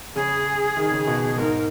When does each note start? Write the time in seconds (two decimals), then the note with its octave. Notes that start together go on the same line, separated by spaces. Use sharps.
0.15 C#3 G#4
0.77 D#3
0.92 C#3
1.07 B2
1.38 G#2 A#4